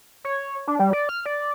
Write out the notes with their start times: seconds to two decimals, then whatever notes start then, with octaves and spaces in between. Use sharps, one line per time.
0.24 C#5
0.68 D4
0.79 G3
0.93 D5
1.09 F6
1.26 D5